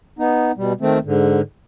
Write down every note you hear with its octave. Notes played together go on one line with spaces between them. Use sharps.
B3 D#4
B2 G3
D#3 A3 C4
G#2 D3